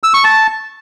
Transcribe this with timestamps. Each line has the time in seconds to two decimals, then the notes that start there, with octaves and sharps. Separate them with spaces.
0.03 E6
0.14 C#6
0.24 A5